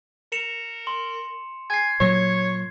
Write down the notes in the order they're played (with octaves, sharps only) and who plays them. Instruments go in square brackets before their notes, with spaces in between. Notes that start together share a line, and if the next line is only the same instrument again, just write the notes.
[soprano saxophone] A#4 [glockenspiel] C#7 E7 F7
[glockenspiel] C6
[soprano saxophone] G#5 [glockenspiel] G#6 C7
[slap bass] A#2 F#3 [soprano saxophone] C#5